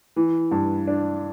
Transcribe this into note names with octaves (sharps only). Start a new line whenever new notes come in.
E3
G2
D4